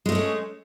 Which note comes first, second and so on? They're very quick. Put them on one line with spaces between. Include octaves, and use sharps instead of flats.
G#3 A3 B3 C#4